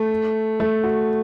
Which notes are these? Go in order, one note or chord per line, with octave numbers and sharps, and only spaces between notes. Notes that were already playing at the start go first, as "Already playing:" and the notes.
Already playing: A3
A3
F#4